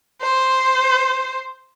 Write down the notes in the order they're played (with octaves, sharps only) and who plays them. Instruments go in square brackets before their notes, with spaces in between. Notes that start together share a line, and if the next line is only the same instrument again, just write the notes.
[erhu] C5